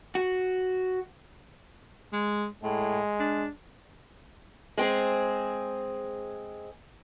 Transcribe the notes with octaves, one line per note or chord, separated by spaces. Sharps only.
F#4
G#3
A2 G#3
D4
G#3 C4 G#4 C5